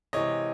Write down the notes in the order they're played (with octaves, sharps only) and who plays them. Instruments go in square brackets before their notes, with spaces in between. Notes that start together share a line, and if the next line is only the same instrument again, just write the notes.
[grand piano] C3 E3 G#3 C#5 D#5